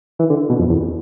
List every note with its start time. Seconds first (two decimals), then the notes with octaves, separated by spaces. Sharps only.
0.19 E3
0.30 D3
0.49 B2
0.59 F2
0.69 E2